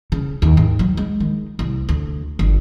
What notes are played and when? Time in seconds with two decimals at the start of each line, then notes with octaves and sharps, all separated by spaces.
0.12 C#3
0.42 D#2
0.57 G#2
0.79 F#3
0.97 G#3
1.20 D#3
1.59 C2
1.89 D2
2.39 G1